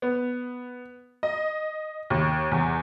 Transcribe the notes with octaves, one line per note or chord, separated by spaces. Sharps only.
B3
D#5
D#2
E2